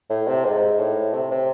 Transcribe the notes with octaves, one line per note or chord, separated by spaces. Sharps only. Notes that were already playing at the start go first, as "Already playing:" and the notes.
A2
C3
G#2
A2
C3
C3